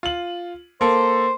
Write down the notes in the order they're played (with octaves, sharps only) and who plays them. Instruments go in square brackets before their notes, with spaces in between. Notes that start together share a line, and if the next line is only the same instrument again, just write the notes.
[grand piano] F4 F#7
[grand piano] A#3 A4 [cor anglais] C5